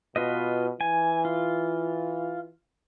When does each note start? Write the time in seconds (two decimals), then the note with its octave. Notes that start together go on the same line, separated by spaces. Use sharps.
0.16 B2 F4 B4 D#5
0.81 E3 G#5
1.25 F4